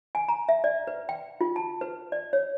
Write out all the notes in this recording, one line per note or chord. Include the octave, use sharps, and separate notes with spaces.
G#5
A#5
E5
D5
B4
G5
F4
A5
B4
D5
C#5